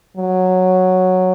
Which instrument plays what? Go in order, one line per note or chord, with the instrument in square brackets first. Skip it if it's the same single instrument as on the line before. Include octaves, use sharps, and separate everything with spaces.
[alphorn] F#3